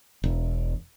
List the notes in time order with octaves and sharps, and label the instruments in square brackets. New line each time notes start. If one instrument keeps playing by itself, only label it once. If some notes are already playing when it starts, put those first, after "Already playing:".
[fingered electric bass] E1